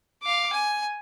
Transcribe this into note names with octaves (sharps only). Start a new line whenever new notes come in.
F5 D6
G#5